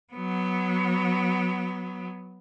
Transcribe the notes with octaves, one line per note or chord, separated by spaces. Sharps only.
F#3 B3